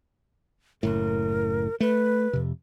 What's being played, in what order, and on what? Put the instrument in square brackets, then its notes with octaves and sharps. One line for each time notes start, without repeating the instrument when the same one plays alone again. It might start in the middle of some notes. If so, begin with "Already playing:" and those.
[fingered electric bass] F#1 A2 [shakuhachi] A#4
[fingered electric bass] A3 [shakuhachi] B4
[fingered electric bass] F2 C3